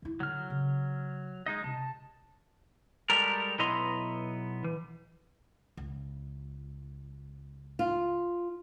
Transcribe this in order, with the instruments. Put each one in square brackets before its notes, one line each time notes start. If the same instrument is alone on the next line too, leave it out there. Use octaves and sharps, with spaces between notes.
[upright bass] D#3 E4
[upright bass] D3 [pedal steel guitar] F#3 F6
[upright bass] C#3
[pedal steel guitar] G#3 D#4 D#5
[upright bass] C3 [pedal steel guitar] A5
[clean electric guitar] G3 G#3 G4 A4 A#4
B1 B3 E4 D#5 A#5 C6
E3
[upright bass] C#2
[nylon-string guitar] F4